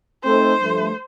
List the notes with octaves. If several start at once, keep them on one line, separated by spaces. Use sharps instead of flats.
A3 C4 D#4 A4 C5
G2 F3 A3